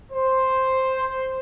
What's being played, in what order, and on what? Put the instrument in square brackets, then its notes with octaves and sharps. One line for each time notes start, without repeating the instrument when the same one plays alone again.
[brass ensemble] C5